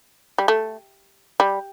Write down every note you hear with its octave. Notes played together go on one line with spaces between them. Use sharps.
G3
A3
G3